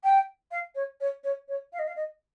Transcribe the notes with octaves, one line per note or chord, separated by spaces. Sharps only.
G5
F5
C#5
C#5
C#5
C#5
F5
D#5
F5
D#5